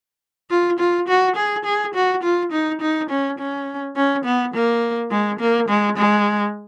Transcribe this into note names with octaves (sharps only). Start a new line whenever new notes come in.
F4
F4
F#4
G#4
G#4
F#4
F4
D#4
D#4
C#4
C#4
C#4
B3
A#3
G#3
A#3
G#3
G#3